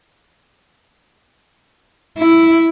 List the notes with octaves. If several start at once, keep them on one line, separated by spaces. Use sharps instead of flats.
E4